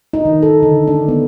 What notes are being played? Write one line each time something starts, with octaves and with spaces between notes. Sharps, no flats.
D#4
D#3
A4
D3
D4
B3